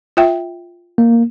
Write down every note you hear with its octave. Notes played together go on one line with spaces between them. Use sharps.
F4 E5 G5
A#3